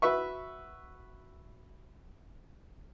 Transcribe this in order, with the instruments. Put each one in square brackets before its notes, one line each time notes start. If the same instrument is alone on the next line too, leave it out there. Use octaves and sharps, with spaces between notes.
[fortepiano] F#4 B4 E5 C#6